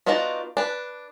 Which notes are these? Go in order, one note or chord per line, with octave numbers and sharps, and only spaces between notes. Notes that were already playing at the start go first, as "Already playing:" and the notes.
B3 D4 D#4 F4 F#4
D4 B4